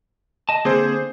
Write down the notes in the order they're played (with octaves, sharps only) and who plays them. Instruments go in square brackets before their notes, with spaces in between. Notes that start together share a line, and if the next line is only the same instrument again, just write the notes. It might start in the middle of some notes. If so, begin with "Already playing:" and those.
[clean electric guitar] D#5 A5
[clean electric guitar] D3 A#3 C4 [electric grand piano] G#4 C5